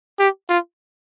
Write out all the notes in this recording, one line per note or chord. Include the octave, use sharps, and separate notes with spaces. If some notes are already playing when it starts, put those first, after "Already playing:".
G4
F4